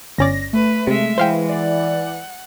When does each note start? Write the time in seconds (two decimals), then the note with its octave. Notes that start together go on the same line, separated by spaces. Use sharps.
0.18 G1 C#4 D5 A#6
0.53 A3 B4
0.87 C3 G#3 E5
1.18 E3 G#3 C5 F5 G5
1.49 D5 F#5